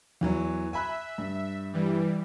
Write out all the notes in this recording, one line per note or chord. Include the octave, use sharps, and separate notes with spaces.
E2 E3 F#3
E5 G#5 B5 F#6
G2
E3 G3